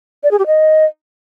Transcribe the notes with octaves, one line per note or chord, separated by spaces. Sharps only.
D5
G#4
G4
D#5